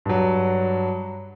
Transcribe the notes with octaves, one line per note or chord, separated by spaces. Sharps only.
G2 F#3